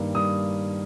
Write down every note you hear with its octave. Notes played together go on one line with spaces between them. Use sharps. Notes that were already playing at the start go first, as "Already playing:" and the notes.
Already playing: G2 D#3 A#3
G2 D#6